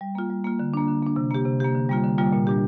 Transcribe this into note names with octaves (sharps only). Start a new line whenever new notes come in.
G3
A#3 F4
G3
A#3 F4
D3
A#3 D4
D3
A#3 D4
C3
A#3 G4
C3
A#3 G4
D3
G3 A#3 F4
D3
G3 A#3 F4
A#2
G3 D4 G4